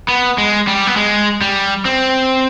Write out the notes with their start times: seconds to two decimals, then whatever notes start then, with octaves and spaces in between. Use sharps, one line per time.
0.08 B3
0.38 G#3
0.67 G3
0.87 B3
0.96 G#3
1.41 G3
1.85 C4